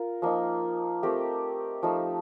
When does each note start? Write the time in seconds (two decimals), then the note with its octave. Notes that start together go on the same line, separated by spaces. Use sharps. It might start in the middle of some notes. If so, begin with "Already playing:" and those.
Already playing: F4 A#4
0.22 F3 A#3 D#4
1.03 A3 C4 G4 A#4
1.83 F3 A3 D#4